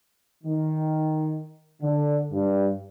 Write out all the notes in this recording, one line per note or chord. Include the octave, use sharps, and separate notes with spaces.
D#3
D3
G2